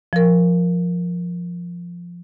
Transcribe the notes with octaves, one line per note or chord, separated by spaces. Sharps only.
F3 A#4